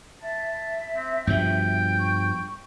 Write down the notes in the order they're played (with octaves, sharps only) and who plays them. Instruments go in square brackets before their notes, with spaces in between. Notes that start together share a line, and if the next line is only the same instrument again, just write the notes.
[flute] E5 [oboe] A5
[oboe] C4
[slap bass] G2 B2 F3 [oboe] G5
[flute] C#6